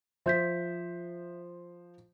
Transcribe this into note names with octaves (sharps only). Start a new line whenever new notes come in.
F3 C5 E5 G6 B6